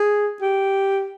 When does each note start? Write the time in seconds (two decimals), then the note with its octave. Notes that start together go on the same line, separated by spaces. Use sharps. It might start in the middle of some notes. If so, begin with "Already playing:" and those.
Already playing: G#4
0.41 G4